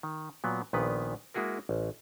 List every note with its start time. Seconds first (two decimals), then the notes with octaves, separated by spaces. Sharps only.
0.03 D#3
0.44 A#2 F#3 B3
0.73 A#1 A#2 D#3 B3 B4
1.34 G#3 A#3 E4 F#4 G#4 A#4
1.69 A1